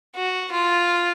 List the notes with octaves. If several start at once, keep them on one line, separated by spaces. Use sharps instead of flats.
F#4
F4